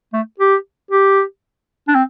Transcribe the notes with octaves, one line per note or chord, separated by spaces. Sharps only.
A3
G4
G4
D4
C4